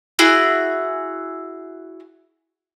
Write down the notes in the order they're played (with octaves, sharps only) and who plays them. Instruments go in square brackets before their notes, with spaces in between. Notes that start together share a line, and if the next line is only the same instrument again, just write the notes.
[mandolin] E4 F#4 G#4